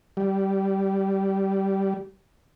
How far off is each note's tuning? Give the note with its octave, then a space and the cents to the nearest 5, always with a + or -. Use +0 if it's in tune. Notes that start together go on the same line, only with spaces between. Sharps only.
G3 -15